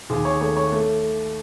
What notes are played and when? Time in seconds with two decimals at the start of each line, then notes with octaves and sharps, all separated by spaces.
0.10 D#2 G#4
0.25 C#5
0.41 A3 C#5
0.56 C#5
0.72 A3